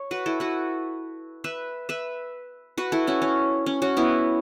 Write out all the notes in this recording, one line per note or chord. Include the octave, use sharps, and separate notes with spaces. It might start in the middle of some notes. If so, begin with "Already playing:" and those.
Already playing: C#5
F#4 B4
E4 A4
F#4 B4
B4 E5
B4 E5
F#4 B4
E4 A4
C#4 F#4
C#4
C#4
C#4 F#4
B3 E4